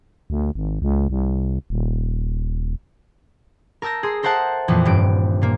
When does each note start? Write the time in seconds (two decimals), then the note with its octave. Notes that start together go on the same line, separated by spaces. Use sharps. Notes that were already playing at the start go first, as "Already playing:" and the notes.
0.30 D2
0.55 G#1
0.82 C#2
1.10 C2
1.70 D#1
3.82 A#4 A5 E6 G6 A#6
4.03 G#4 C6
4.23 A4 A#4 C5 E5 F#5 A5
4.68 F2 A#2 E3 F3
4.85 D#1 G2 D7
5.42 A#2 A#3